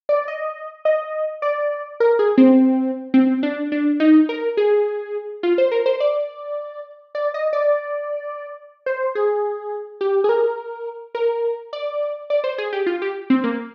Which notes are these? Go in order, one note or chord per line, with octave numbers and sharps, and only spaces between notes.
D5
D#5
D#5
D5
A#4
G#4
C4
C4
D4
D4
D#4
A#4
G#4
F4
C5
A#4
C5
D5
D5
D#5
D5
C5
G#4
G4
G#4
A#4
A#4
D5
D5
C5
G#4
G4
F4
G4
C4
A#3